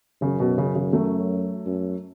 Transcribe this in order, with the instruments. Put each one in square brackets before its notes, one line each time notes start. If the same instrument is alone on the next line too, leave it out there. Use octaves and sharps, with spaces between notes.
[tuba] F#2 [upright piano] C#3
[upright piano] B2
C#3
C#3
F#3 A3
[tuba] F#2